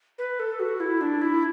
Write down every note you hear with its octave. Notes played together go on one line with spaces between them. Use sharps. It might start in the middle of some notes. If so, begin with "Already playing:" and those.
B4
A4
F#4
E4
D4
E4